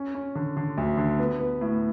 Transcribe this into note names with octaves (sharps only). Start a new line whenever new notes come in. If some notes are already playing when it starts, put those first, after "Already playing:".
Already playing: C#4
C#4
D3
D3
D2
D3
B3
B3
A2